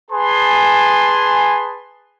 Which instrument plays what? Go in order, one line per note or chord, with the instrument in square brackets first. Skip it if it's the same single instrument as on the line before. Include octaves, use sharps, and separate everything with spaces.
[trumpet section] G#4 B4 G#5 A5 C6